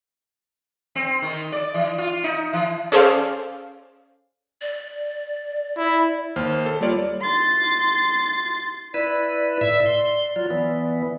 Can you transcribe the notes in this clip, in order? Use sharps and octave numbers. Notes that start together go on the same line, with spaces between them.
C4
D#3
D5
E3
F4
D#4
E3
C#4 G#4 A4 C5 D5 F5
D5
E4
D#2 C5 F6
A4
G3 A#3 F4 C#5 D5
C6 A6
E4 B4 D5
A2 E5 E6
C6
F#3 F4 D5
E3 B3